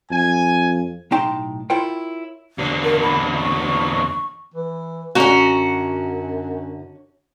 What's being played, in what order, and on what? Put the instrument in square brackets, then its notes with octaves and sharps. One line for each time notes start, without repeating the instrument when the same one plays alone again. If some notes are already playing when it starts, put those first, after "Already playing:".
[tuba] F2 [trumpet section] G#5
[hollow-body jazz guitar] B1 A2 D#4 G5 A5 C6
E4 F4 A#4 C#5 G5
[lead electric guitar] E2 D3
[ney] A#4
B5
C#6
[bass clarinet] E3
[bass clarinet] F#2 [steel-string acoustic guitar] D3 D#5 A#5 [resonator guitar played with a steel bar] C#4 F#4